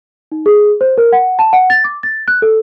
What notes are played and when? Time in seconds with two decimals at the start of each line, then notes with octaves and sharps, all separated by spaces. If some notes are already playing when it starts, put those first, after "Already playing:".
0.32 D#4
0.46 G#4
0.81 C5
0.98 A#4
1.12 F#5
1.39 A5
1.53 F#5
1.70 A6
1.84 D6
2.03 A6
2.28 F#6
2.42 A4